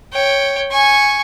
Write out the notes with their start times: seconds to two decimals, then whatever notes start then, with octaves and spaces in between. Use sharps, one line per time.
0.13 C#5 G5
0.71 G#5 C#6